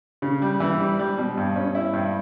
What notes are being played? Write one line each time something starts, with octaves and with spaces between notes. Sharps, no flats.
C#3
G3
E3
G3
G3
B2
G2
C#4
E4
G2